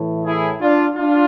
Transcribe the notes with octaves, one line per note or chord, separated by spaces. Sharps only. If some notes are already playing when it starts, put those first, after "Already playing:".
Already playing: A2 E3
E4 G#4
D4 F4
D4 F4